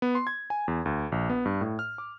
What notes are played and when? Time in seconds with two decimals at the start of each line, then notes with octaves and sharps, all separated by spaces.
0.02 B3
0.15 C6
0.27 G#6
0.50 G#5
0.68 E2
0.86 D2
1.12 A#1
1.30 B3
1.45 G2
1.61 A2
1.79 F6
1.98 D6